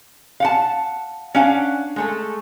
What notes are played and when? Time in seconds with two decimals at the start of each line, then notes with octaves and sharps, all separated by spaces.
0.40 F5 F#5 A5
1.35 C#4 D4 F5 F#5
1.96 G#3 A3 A4